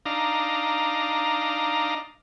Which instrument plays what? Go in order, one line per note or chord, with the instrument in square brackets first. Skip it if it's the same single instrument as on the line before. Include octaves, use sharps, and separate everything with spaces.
[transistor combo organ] D4 D#4 F5 A#5